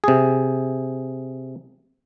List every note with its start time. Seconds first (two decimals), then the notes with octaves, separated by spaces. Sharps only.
0.04 C3 G#4